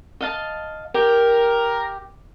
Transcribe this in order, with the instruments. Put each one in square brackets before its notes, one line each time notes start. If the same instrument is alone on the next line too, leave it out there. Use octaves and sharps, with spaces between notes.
[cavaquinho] D#5 F5 A5
[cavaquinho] G4 [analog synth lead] A#4